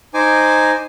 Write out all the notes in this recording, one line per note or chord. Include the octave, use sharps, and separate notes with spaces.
D#4 C5 G#5 D6